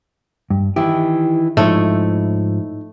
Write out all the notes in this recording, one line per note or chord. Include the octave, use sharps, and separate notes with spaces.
G2
D#3 E3 E4 G4
G#2 F3 A3 D#4 E4 C#5